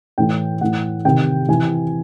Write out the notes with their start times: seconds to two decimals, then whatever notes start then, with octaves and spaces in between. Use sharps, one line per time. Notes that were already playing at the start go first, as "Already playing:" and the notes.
0.18 A2 E3 G5
0.61 A2 E3 F#5
1.05 C3 D#3 G5
1.48 C3 E3 G#5